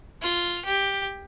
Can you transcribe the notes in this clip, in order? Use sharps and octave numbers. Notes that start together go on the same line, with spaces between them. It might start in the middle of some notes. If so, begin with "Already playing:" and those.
F4
G4